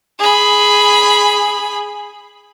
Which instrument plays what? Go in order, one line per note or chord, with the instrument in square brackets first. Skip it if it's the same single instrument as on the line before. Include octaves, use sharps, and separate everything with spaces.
[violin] G#4 B5